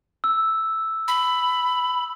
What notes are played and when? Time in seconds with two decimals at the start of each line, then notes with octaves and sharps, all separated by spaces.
0.24 E6
1.08 B5